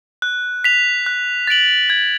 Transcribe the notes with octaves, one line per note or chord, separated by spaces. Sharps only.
F#6
B6 F7
F#6
A6 D7 F#7
G#6